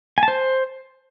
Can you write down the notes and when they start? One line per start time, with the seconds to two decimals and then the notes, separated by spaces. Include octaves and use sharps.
0.18 G#5
0.23 A5
0.28 C5